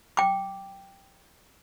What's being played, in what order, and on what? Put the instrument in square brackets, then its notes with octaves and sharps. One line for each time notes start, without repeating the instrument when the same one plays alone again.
[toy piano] G5 D6